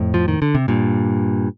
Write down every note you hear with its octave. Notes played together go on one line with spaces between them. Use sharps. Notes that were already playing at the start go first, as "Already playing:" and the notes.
Already playing: F2 A2
F3
D#3
D3
C3
G2 A#2